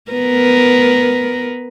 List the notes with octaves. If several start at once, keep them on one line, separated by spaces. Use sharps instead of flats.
B3 A#4 B4